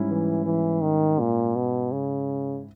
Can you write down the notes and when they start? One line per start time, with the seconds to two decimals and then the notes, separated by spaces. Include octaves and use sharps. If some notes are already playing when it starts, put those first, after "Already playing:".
Already playing: G#2 G3 C#4 E4
0.10 E3
0.46 E3
0.82 D#3
1.19 A#2
1.56 B2
1.92 C#3